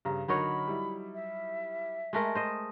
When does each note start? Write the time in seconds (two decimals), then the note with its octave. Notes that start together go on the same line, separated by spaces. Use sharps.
0.05 G2 C#3 A#5
0.28 D3 F#3 D#4 A#4 C#5 B5
0.68 G3 E4
1.15 E5
2.13 G#3 A3 A#4
2.35 C5 D#5